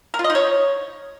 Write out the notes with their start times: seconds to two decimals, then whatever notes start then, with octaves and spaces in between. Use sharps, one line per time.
0.14 A#4
0.19 F4
0.24 D#5
0.30 D#4
0.35 C#5